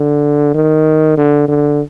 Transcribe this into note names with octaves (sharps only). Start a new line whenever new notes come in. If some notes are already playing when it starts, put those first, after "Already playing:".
Already playing: D3
D#3
D3
D3